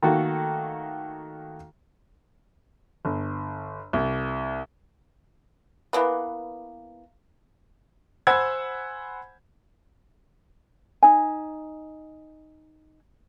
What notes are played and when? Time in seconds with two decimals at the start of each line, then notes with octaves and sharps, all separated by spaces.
0.02 D#3 A3 A#3 F#4 A4
3.05 G1
3.93 C2
5.93 E3 A#3 B3
8.27 C5 F#5 G#5 B5 E6 G#6
11.03 D#4 G#5